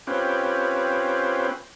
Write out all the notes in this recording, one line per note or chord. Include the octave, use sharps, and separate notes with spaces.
C4 C#4 F4 G4 B4